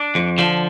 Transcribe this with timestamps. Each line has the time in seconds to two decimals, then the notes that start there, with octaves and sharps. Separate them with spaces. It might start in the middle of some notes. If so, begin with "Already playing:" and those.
Already playing: D4
0.15 F2
0.38 D3 F3